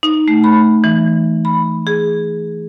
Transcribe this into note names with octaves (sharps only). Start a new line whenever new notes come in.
D#4
A3
B5
E3
B5
G#4